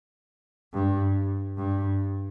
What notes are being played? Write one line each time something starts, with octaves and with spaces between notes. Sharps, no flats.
G2
G2